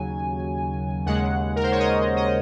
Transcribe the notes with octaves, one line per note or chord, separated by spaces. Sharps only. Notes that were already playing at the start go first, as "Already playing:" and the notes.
Already playing: D#2 C#3 F#3 G#5
D#2 C#3 G#3 F#5
A#4
C5
C#5
D#5
D#5